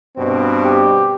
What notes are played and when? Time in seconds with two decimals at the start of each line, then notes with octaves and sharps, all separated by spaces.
0.16 G2 B2 C4
0.65 G4